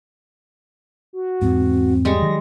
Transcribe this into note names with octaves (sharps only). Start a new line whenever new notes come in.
F#4
E2 G#2 C4
G3 G#3 C#6 A#6
D#3 F#3